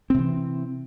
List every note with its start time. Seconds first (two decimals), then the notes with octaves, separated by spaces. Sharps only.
0.10 C4
0.14 C3
0.19 E3